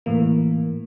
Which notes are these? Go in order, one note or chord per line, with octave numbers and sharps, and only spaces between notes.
A2 E3 A#3